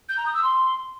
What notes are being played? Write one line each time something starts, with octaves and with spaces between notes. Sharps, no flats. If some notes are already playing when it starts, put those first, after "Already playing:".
G6
A#5
D#6
E6
C6